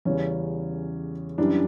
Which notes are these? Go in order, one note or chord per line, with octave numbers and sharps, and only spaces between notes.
E2 C#3 G3 C#4
F#2 E3 G3 D4